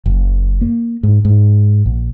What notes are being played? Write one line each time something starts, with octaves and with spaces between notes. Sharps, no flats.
F#1
A#3
G#2
G#2
A#1